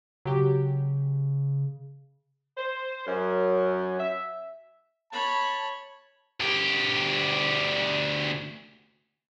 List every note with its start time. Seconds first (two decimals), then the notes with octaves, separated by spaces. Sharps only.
0.25 C#3 F#3 G4
2.57 C5
3.07 F#2
3.99 E5
5.12 C#5 A5 B5
6.40 D2 G4